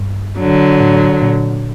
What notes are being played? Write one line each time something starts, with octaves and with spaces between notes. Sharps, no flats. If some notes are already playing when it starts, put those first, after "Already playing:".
Already playing: G2
D3 F#3
A2
A#2